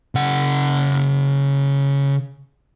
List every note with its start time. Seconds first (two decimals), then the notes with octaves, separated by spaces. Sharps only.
0.15 C#3 F#5